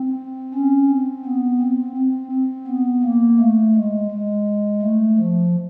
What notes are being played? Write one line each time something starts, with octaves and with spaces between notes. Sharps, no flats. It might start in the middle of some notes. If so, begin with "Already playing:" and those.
Already playing: C4
C#4
C4
B3
C4
C4
C4
B3
A#3
A3
G#3
G#3
A3
F3